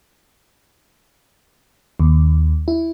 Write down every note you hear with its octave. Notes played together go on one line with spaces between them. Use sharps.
D#2
E4